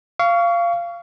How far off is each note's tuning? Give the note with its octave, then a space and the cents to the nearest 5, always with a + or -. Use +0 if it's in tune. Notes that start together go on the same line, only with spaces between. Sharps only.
F5 -15 C#6 +30